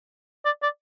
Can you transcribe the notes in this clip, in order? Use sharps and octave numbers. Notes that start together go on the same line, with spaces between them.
D5
D5